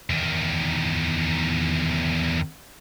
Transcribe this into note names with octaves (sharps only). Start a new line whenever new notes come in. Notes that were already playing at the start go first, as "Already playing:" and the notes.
E2 D#3